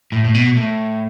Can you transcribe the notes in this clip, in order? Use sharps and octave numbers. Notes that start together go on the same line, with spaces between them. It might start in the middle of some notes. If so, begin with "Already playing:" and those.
A2
A2
B2
A2